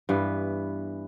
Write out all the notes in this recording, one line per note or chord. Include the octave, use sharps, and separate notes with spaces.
G2 E3 B3